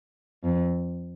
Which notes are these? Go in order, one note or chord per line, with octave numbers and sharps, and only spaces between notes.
F2